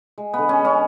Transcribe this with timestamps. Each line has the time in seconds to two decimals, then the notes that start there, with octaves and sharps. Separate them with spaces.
0.18 G#3
0.33 D3 B3
0.49 C#4
0.59 G#3
0.65 C#4